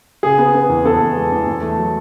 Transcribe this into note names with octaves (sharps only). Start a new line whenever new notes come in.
C#3 G#4
B3
B3
E2
B3 A4
E2
G#3
E2
E2
A3
F#3